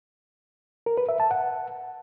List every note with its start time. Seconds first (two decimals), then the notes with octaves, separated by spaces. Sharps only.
0.86 A#4
0.97 B4
1.09 E5
1.20 A5
1.31 F#5